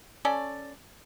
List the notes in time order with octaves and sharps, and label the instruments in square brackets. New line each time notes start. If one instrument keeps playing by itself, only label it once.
[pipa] C#4 A4 D5